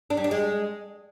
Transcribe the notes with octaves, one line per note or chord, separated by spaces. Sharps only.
D4
G3
D4
G#3